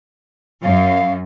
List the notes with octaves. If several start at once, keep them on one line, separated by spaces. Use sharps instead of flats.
F#2 F5